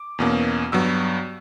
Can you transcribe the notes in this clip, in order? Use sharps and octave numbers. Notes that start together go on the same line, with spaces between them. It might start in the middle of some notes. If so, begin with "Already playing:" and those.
Already playing: D6
E2 B2 A#3 C#4
G2 F#3 B3 E6